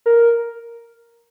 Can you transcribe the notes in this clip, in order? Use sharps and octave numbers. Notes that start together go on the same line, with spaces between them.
A#4